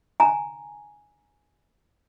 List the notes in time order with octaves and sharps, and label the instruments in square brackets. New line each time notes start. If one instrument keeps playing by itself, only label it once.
[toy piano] G#5 A#5